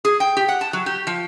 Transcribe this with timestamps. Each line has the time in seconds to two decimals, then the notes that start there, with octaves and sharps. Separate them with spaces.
0.05 G#4
0.20 G5
0.37 G4
0.48 F#5
0.61 A5
0.73 F#3
0.86 G4
1.07 F3